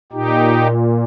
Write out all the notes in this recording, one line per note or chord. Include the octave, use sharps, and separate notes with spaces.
A#2 D#4 G4